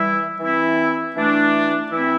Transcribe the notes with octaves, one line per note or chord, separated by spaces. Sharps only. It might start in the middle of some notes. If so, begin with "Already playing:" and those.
Already playing: E3 G3 E4
E3 C4 E4
E3 A3 D4
E3 C4 E4